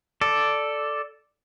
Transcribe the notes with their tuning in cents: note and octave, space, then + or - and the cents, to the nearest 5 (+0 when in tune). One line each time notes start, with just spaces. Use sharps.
A4 +0 D5 +0